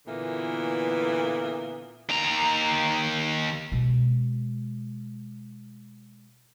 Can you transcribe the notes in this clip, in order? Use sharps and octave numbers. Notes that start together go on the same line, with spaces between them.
A#2 D3 E3 A#3 B3
D#2 A#5
B2 G#3